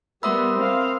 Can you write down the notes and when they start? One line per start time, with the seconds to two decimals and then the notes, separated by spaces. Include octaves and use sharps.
0.23 G3 B3 A#4 E5 B5 C6 D#6 E6
0.58 C4 F5